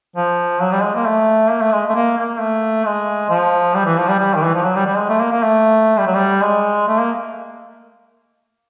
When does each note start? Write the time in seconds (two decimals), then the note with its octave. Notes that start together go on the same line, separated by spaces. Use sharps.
0.16 F3
0.61 F#3
0.72 G3
0.83 G#3
0.95 A#3
1.06 A3
1.50 A#3
1.62 A3
1.73 G#3
1.90 A3
1.95 A#3
2.18 A#3
2.40 A3
2.85 G#3
3.30 F3
3.74 G3
3.86 E3
3.98 F3
4.08 G3
4.19 G3
4.36 D#3
4.45 E3
4.54 F3
4.64 F#3
4.75 G3
4.86 G3
4.98 G#3
5.09 A3
5.21 A#3
5.32 A#3
5.43 A3
5.99 G3
6.07 F#3
6.15 G3
6.44 G#3
6.88 A3
7.00 A#3